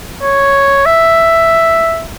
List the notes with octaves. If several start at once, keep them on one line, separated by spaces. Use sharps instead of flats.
C#5
E5